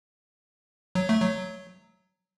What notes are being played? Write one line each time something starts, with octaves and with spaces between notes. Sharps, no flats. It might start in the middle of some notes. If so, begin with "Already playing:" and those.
F#3
A3
F#3